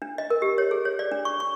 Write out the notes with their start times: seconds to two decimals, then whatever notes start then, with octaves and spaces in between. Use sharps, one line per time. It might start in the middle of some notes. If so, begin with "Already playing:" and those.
0.02 D4
0.18 D#5
0.30 A#4
0.42 G4
0.58 C#5
0.71 G#4
0.85 C#5
0.99 D5
1.12 D4
1.25 C#6
1.40 C#6